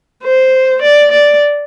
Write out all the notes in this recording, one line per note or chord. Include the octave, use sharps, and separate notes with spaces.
C5
D5
D5